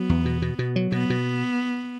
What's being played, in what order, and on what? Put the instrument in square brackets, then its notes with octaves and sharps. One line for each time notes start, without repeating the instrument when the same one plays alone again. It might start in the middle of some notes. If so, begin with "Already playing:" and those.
Already playing: [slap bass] F#3 [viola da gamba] B3
[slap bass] E2
B2
B2
B2
F#3
[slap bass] B2 [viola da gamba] B3
[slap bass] B2